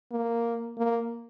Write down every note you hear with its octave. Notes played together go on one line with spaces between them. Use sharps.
A#3
A#3